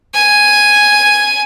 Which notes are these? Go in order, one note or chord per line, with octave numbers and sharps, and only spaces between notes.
G#5